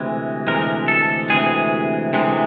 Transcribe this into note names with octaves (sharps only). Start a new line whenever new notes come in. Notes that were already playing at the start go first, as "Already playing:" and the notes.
Already playing: D2 C3 E3 G#3
D2 C3 E3 G#3 A#4
A4
D2 C3 E3 G#3 G#4
D2 C3 E3 G#3